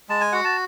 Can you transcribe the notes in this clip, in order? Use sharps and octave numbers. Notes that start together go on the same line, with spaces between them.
G#3 A5
G#5
F#4 F#5
A5